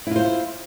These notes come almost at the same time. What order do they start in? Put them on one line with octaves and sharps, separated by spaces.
E4 F4 C5